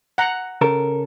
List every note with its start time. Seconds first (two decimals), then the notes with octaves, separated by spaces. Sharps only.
0.18 F#5 A#5
0.61 C#3 A4 A#4